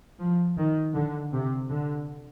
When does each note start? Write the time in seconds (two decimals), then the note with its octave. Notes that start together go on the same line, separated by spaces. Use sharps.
0.20 F3
0.57 D#3
0.94 D3
1.33 C3
1.70 D3